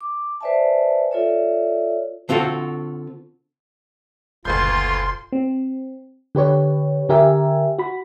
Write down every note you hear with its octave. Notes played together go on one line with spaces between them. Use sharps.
D6
B4 C5 D5 E5 G#5 A5
F4 A4 C#5 D5 E5
D3 C4 F4 F#4 A4
F#1 D2 A#2 F4 B4 C6 G6
C4
D3 G4 B4 C#5
D3 G4 A#4 E5 G#5
F#4 B5